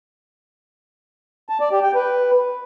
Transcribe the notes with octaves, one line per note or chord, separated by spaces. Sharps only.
A5
D5
G4
G5
B4